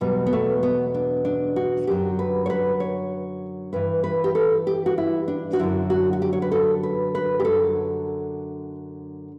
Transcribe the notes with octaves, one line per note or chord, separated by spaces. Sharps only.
E2 B2 F#3 G3
B3
A3
B3
D4
D4
F#4
F#2 D3 F#3 G4
B4
C#5
B4
C#5
G2 E3 B4
B4
G4
A4
G4
F#4
E4
D4
F#4
F#2 D3 F#3 E4
F#4
F#4
G4
C#5
B4
A4
B4
B4
G4
F#2 D3 F#3 A4